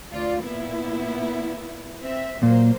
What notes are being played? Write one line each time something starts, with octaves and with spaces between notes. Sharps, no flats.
D2 F4 D5
A#2 B3 E4
C4 E5
A#2 F#3 A#3 C5